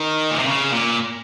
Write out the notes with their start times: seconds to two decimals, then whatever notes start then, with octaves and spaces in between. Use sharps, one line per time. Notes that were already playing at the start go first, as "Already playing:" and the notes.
Already playing: D#3
0.31 A#2
0.39 C3
0.47 C#3
0.73 A#2